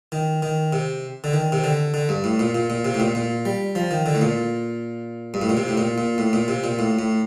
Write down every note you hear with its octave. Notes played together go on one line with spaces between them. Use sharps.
D#3
D#3
C3
D3
D#3
C3
D3
D3
G2
A2
A#2
A#2
A#2
C3
A2
A#2
A#2
G3
F3
D#3
D3
A2
A#2
G2
A2
A#2
C3
A2
A#2
A#2
A2
A#2
C3
A#2
A2
A2